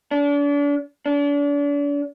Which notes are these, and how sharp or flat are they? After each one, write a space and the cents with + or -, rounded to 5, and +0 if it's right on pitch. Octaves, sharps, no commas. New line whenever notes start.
D4 -35
D4 -40